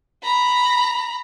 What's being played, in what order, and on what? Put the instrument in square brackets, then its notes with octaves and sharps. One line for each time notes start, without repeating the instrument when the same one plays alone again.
[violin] A#5 B5